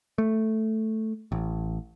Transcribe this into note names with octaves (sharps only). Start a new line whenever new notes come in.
A3
A1